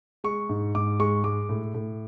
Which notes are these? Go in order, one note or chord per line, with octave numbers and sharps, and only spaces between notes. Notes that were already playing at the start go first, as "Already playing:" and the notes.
G#3 C#6
G#2
G#2 D6
G#3 C#6
G#3 D6
A2
A2